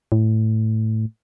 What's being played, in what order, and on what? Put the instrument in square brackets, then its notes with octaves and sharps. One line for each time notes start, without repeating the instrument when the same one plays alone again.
[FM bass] A2